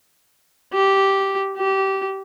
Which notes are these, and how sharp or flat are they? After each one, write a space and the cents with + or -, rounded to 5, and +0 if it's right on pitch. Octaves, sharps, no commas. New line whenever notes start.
G4 -10
G4 -20